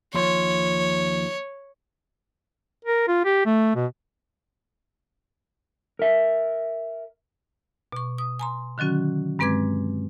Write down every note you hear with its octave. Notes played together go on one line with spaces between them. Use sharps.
D#2 F3 C#5 C6
A#4
F4
G4
A3
B2
A#4 E5
B2 C#6
D#6
G#5 A#5 C6
D3 D#3 F#3 C#4 F#4
G2 G#3 C4 B4 D6 G#6